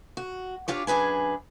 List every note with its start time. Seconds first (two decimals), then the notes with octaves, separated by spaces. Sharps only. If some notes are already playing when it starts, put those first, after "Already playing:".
0.17 F#4
0.68 D4 F4 G4 C#5
0.87 F#2 D4 G#4 B4 G#5